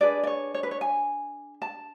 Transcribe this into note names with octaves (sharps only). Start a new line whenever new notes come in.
D4 G#4 B4 D5
D5
C#5
C#5
B4
C#5
G#5
A5